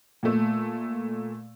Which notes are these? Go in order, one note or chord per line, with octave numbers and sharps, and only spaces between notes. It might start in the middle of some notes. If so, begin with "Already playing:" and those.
A#2 A3